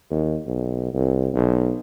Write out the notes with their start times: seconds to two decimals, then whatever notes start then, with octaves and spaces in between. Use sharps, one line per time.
0.11 D#2
0.46 B1
0.93 C2
1.34 B1